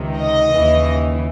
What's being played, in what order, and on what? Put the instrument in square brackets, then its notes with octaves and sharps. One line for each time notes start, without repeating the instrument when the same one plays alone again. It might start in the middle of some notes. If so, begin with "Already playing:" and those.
Already playing: [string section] C#2 C3 D#3
D#5
D#2 C#3 E3